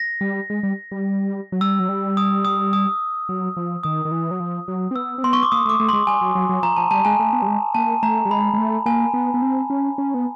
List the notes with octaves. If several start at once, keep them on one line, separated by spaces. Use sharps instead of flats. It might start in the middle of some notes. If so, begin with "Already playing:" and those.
Already playing: A#6
G3
G#3
G3
G3
F#3
G3 E6
F#3
G3
D#6
D#6
D#6
F#3
F3
D#3 D#6
D#3
E3
F#3
F3
F#3
C4
B3 E6
C4
B3 C6
C#6
D6
A#3 D#6
A3 D6
A3
G#3 C6
G3 G#5
F#3
F#3
F#3
F3 A#5
F3 A5
G3 A5
G#3 G#5
A3
B3
G3
G#3
A#3 A5
A3 A#5
G3
G#3 B5
G#3
A3
A#3 G#5
B3
B3
C4
C#4
C#4
B3